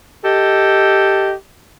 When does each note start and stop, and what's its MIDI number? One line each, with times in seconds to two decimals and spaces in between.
0.23 1.31 67
0.23 1.31 69
0.23 1.31 75